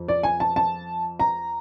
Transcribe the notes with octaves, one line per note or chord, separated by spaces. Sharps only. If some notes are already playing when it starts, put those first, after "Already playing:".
Already playing: F2
D5
G#5
A5
A5
A#5